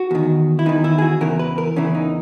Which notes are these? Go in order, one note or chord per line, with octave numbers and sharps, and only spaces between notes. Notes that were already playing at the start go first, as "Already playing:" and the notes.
Already playing: F#4
E2 D#3
E4
E2 D#3 D#4
E4
G#4
F#4
E2 C#3 E3 A#4
B4
A#4
E2 C#3 E3 C#4
D#4